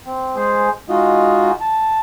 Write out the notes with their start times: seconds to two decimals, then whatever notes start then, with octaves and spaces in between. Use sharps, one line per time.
0.06 C4
0.36 G#3 G#4 C5
0.89 G#3 D#4 F4 F#4 D#5
1.61 A5